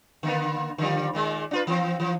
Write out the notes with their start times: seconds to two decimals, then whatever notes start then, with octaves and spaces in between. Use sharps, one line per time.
0.23 D3 A#3 B3
0.78 D3 F3 G3
1.13 A#2 D#3 G#3
1.51 D4 F4 B4
1.67 E3 F3 C4
2.00 E3 F3